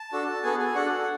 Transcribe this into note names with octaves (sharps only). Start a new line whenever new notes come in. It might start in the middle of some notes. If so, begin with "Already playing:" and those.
Already playing: A5
D4 F#4 A4
B3 F#4 G#4 A4 G#5
G#4 G#5
D4 F#4 A4 F#5